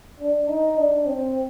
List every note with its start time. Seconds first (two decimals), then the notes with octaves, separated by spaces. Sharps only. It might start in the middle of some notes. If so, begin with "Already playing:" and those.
0.20 D4
0.48 D#4
0.78 D4
1.06 C4